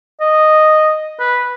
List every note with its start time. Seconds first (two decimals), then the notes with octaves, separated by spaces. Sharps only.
0.21 D#5
1.20 B4